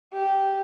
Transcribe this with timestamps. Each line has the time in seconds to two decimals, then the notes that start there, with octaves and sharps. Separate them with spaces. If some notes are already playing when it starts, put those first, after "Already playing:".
0.14 G4